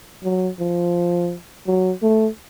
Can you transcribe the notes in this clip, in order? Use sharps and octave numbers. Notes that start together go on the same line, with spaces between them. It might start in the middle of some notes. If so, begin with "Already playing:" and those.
F#3
F3
F#3
A3